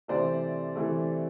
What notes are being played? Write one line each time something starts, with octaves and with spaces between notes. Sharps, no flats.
C3 E3 A3 C5 D5
C3 E3 A3